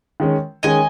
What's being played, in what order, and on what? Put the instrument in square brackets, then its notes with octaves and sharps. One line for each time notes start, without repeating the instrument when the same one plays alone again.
[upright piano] D#3 G#3 C#4
[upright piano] D#3 G#3 C#4 [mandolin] D#5 G#5